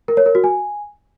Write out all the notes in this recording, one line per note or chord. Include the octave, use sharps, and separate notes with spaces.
A#4
C#5
A#4
F#4
G#5